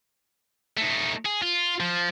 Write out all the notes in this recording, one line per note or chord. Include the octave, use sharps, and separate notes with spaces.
A3 D#4
G#4
F4
F3